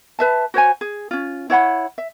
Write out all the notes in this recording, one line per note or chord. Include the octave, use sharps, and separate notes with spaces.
B4 E5 A5
F#4 C5 C#5 G#5
G#4
C#4 F4
E4 C#5 F#5 B5
E5